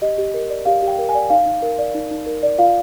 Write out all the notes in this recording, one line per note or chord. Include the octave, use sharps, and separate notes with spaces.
G4 D#5
G4
A#4
D5
G4 F5
G4
G5
A#4
G#5
D5
D#4 F5
D#4
A#4
D5
D#4
D#4
A#4
D5
F4 F5